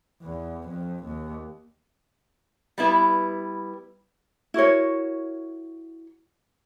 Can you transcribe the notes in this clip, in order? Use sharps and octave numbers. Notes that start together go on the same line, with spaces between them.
E2
F2
D#2
G3 B3 E4 B4
E4 F#4 A#4 C#5